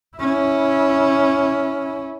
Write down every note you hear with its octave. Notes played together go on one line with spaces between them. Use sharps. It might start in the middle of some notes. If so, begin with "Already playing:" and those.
C#4 E4